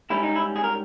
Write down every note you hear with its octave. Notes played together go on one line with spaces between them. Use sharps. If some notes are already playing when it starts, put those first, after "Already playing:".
G#2 G3 C#4 E4
D#4
E4
G#4
A#4